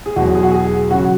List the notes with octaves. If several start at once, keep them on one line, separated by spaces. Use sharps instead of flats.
G#4
E2 B2 F#3 F#4
G#4
F#4
G#4
C#3 F#3 F#4